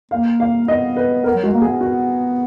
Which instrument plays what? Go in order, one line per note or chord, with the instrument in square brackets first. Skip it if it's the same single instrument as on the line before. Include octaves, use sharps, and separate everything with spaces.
[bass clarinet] A#3 [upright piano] F5
[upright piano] F5
[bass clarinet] B3 [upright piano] D#5
[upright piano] B4
[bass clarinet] B3 [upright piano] A#4
[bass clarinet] F#3
[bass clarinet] G#3 [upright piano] F#4
[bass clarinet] A#3
[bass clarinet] B3 [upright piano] G#4
[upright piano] F#4